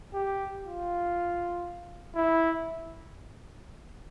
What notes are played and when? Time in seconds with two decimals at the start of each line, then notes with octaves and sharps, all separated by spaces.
0.14 G4
0.65 F4
2.15 E4